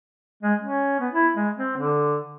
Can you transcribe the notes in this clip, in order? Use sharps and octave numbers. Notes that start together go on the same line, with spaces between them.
G#3
C#4
B3
E4
G#3
C4
D3